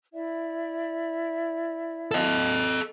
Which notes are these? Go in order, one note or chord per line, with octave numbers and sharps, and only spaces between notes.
E4 D5 E5
A4 D#5